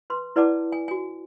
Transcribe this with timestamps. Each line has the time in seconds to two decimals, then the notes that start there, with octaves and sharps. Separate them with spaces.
0.10 B4 C6
0.36 E4 B4 D5 F#5 A5 D6
0.72 G#5
0.88 F#4 G#5